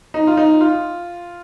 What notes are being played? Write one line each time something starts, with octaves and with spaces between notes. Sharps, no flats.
D#4
F4
D#4
F4